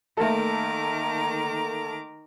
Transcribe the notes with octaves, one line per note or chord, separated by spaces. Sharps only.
D#3 A3 A#3 A4 A#5 D6